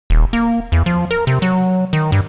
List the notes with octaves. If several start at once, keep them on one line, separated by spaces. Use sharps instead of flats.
D#1
A#3
E2
F3
A#4
C3
F#3
D#3
G2